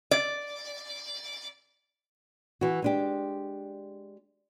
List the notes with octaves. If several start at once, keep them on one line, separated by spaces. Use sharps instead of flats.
D5
E3 F#4
G#3 D4 G4